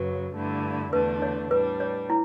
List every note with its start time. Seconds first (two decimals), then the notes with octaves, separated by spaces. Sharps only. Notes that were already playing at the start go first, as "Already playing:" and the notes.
Already playing: F#2 C#3 F#3 B4
0.34 G2 D3 A3 E4
0.92 E2 D3 A3 D4 B4
1.22 C#5
1.51 A2 G3 D4 B4
1.80 C#5
2.10 E4